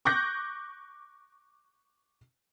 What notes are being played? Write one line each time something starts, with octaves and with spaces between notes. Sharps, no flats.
C#6 D6 F#6 G6 A#6